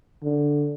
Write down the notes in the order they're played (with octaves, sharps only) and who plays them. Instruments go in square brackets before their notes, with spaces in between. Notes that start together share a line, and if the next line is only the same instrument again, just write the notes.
[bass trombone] D3